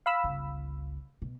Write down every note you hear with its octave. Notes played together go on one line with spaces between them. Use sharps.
F5 B5 E6
G1 C#2
B2